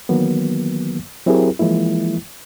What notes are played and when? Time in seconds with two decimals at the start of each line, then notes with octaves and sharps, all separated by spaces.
0.09 D#3 E3 F#3 A#3 B3
1.26 F#3 C4 E4 G4 G#4 A#4
1.59 E3 F3 G#3 A#3 E4